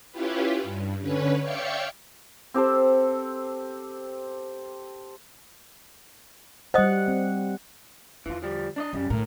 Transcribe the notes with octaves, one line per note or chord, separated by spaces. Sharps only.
C#4 E4 F4 G4 B4
G2
D3 C#4 B4 C#5
C#5 D5 E5 F5 G5 C#7
C4 G4 A4 C5
G3 C5 D#5 F#5 D#6
C4
E2 D3 E3 F4
F3 G3
D4 D5 D#5
C2 F#2 C#3 G3
A2 D3 A#4